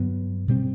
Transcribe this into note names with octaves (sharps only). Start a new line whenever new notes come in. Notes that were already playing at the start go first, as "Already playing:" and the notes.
Already playing: G2 D3 F#3 B3
B2 G3 C4